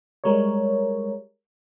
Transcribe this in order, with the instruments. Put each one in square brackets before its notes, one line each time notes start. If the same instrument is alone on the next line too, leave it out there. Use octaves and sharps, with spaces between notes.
[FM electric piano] G3 G#3 A#4 C#5